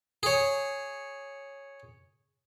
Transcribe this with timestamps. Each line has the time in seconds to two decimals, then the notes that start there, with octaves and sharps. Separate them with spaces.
0.23 G#4 C#5